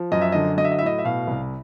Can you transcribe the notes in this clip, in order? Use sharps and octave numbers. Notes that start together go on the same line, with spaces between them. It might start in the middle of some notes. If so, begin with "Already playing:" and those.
Already playing: F3
F#2 D#5
E5
D3 D#5
F#3 D#5
E5
D#5
E5
A2
D#5
E5
B2 F5
C2